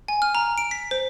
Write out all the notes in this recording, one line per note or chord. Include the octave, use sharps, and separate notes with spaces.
G#5
F6
A#5
D7
B6
C5